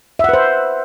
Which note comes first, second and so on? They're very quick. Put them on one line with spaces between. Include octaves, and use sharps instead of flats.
E5 F#5 B4 C5